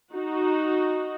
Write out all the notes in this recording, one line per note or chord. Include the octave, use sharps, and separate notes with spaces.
D#4 F#4